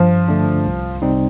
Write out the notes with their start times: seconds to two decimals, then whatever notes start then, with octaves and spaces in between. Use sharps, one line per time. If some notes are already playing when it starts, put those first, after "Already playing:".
Already playing: G2 F3
0.28 D3 A3 D4
0.65 C2
1.02 C3 G3 C4 D#4